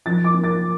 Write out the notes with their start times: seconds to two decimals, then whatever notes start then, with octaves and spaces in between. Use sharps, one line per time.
0.06 F3 A6
0.24 D6
0.34 A#3 F4
0.44 A6